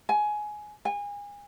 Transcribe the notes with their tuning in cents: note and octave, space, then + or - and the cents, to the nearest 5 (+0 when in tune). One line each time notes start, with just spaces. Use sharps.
G#5 +15
G#5 -30